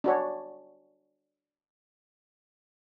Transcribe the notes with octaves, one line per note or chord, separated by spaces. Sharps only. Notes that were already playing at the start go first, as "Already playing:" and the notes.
D4 F#4 C#5